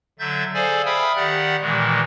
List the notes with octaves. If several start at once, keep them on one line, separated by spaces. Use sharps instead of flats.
D3 F#3 E5 G6 A6
G#4 A4 C5 D5 F5 G#5
E5 F5 G5 B5 D#6 F6
D#3 G4 D5 F#5 F#6
A#2 D#3 E3 G#3